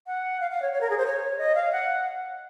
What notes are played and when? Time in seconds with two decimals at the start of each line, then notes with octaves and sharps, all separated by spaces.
0.07 F#5
0.40 F5
0.51 F5
0.62 C#5
0.73 C#5
0.81 A#4
0.90 G#4
0.98 C5
1.06 C#5
1.38 D#5
1.55 F5
1.72 F#5